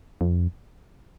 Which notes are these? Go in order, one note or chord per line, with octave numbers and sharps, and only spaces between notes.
F2